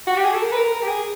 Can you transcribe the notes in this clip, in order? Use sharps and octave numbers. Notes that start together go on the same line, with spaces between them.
F#4
G4
G#4
A4
A#4
B4
A#4
A#4
G4
G#4